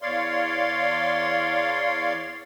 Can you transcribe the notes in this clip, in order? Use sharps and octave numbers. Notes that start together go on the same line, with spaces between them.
E2 C#5 D5 F5 C6